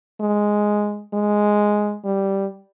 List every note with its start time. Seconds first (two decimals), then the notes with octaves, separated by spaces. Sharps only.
0.20 G#3
1.13 G#3
2.04 G3